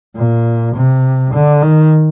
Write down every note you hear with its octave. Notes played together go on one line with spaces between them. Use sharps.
A#2
C3
D3
D#3